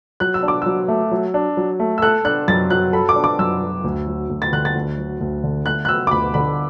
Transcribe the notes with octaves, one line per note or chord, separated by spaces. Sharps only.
F#3 F#6
E6
D4
D6
F#3 E6
A3
F#3
D4
F#3
A3
E6
A4 F#6
D4 F#6
F#2 A6
F#3 F#6
A4 B5
D6
D4
D6
F#2 E6
F#3
D2
F#3
D2
A6
D3 F#6
A6
D2
F#3
D2
D3
A3 F#6
F#6
F#3 E6
D6
D2 B5
D3 B5